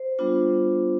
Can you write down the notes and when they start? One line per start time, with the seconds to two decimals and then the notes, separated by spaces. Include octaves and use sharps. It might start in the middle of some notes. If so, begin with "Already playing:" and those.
Already playing: C5
0.19 G3 B3 D4 F4